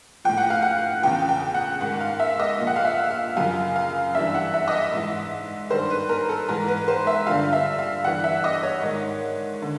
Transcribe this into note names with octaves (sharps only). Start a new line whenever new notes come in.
A2 F3 G5
F#5
F5
F#5
E2 C#3 F3 G5
G5
F#5
G#2 D#3 F#5
F5
E5
D#5
A#2 F3
F#5
F5
E5
F5
F#2 C#3 F3 F5
F5
G2 E3 E5
F#5
E5
D#5
E5
G#2 E3
G2 D#3 C5
B4
A#4
A4
G#2 E3 A#4
B4
C5
E5
G2 D3 F3 F5
E5
F5
G2 E3 F#5
E5
D#5
C#5
G#2 D#3
D3